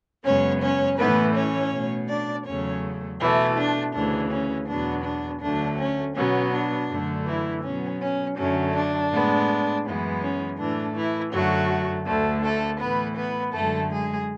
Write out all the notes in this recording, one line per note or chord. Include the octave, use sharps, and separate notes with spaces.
F#2 C#3 G#3 B3 C#4 C#5
C#4 C#5
A2 E3 A3 B3 B4
C#4 C#5
B2 A3
D4 D5
E2 C#3 F#3 A3 C#4 C#5
B2 E3 A3 E4
D4
D2 C#3 E3 D4
C#4
E2 B2 F#3 B3 D4
D4
D2 D3 F#3 A3 D4
C#4
B2 F#3 B3 C#4
D4
F#2 D3 A3
E3 E4
B2 F#3 B3 C#4
C#4
F#2 D3 F#3 A3 C#4
D4
A2 G#3 B3
F#2 E3 G#3 B3
C#4
A2 E3 A3 D4
E3 E4
F#2 D3 F#3 A3 F#4
D2 D3 A3
A3 A4
A2 E3 A3 B3 B4
B3 B4
F#2 D3 G#3 A3 A4
G#3 G#4